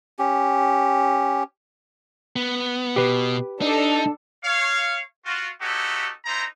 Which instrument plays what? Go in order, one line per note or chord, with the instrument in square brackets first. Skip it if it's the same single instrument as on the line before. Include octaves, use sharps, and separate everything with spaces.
[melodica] C#4 G4
[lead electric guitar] B3
[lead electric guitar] B2 [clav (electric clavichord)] G4 B4
[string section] D4 A4 [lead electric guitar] D#4
[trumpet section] C#5 F5
F4 F#4
C#4 D#4 E4 F#4 G4 A4
D#4 E4 A4 C5 A#5